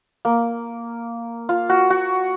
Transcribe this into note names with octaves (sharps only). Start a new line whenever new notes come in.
A#3
F4
F#4
F#4